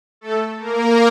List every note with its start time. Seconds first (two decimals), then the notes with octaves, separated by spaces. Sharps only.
0.21 A3 A4
0.59 A#3 A#4